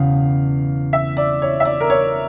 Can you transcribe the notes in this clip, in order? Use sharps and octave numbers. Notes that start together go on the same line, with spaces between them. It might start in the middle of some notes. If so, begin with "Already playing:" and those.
Already playing: E1 E2 C#3 F5
E5
D5
C#5
E5
D5
A#4
C#5